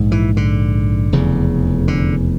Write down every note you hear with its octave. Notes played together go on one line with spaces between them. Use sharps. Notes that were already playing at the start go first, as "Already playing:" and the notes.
Already playing: A#1 G#2
E3
D3
F1 E2 C#3
D3